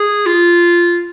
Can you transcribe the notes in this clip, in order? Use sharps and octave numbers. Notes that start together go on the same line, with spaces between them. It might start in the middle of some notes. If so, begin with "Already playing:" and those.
Already playing: G#4
F4